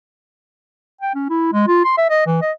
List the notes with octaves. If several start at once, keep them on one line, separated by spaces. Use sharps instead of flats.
G5
C#4
E4
G#3
F4
C6
E5
D#5
E3
D#5